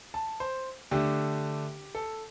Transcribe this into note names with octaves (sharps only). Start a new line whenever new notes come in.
A5
C5
D3 A3 D4 G4
A4